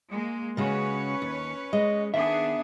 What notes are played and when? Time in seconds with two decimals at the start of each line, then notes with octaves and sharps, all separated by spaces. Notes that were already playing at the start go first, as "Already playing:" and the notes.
0.10 G#3 A#3
0.57 C#3 G#3 C#4 F#4 B4 C#5
1.22 D#2
1.73 G#3 D#5
2.14 D#3 B3 D4 G#4 E5